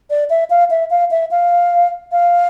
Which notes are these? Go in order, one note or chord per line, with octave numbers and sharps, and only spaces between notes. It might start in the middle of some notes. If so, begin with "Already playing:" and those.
D5
E5
F5
E5
F5
E5
F5
F5